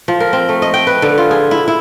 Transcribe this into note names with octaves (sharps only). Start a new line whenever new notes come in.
F3
A#4
C4
A3
D#5
G5
B4
D3
F4
G#4
E4
E4